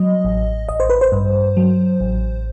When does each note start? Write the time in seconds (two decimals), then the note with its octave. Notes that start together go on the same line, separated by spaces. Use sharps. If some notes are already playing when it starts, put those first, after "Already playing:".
Already playing: F#3 D#5
0.25 A1
0.69 A1 D#5
0.80 C5
0.90 B4
1.01 C5
1.12 G2
1.57 F#3
2.01 A1